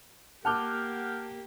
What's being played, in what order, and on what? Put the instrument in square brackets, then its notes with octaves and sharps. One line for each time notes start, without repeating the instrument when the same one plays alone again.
[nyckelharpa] A#3 G4 [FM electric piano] F#5 F6 G6 [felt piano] A5 D6